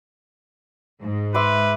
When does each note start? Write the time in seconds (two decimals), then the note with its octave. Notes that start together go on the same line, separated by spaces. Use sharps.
1.02 G#2
1.34 B4 E5 C6 D6